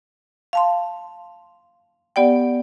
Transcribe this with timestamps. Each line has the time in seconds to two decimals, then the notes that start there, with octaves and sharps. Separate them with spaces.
0.53 F5 A5 C6
2.16 B3 G4 D5 F#5 G5